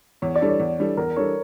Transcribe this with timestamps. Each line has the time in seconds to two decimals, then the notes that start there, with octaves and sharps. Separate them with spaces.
0.22 E2 C#5
0.36 D5
0.41 E3 G3 D4 A4
0.49 C#5
0.60 E2
0.79 E3 G3 D4 A4
0.97 E2 A#4
1.16 E3 G3 D4 A4 C#5